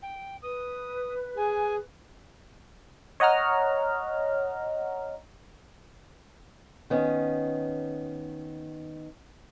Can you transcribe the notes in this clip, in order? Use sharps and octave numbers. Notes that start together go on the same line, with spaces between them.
G5
B4 D#6
G#4 G#5
C#5 D#5 F#5 A#5 F6
D#3 B3 C#4